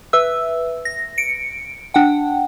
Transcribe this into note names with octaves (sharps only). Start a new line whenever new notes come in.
B4 E5 E6
A#6
C#7 D7
D4 F#5 G5